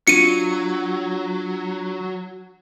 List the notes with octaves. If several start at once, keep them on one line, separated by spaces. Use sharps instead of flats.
F#3 D4 F4 C#7 D#7